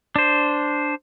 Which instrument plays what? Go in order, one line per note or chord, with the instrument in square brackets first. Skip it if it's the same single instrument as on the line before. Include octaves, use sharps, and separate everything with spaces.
[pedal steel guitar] D4 C5